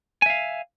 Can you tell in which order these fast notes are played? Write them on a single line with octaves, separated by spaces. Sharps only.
G#5 E5 F5